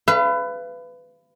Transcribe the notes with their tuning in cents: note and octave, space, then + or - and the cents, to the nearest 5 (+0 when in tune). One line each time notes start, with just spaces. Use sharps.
B4 +20 F5 -40